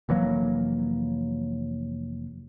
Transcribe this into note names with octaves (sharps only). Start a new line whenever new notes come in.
F1 E3 F#3 A#3